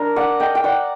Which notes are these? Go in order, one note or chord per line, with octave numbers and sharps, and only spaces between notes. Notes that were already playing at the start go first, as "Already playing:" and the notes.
Already playing: D4 A#4
D5 F#5
D#5 G5
G5
D5 F#5